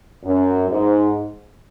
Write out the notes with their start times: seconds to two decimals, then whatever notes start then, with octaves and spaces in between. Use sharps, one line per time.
0.24 F#2
0.70 G#2